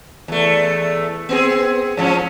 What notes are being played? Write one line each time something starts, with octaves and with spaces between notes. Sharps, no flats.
E2 A3
B3 C4 G#4
G#2 F3 C#4